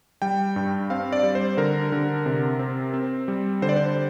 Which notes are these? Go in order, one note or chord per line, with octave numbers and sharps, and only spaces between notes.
G3 G5
G2
C4 F5
D5
G3
C5
D3 A#4
D3
C3
C4
C4
G3
D3 C5
D5
C5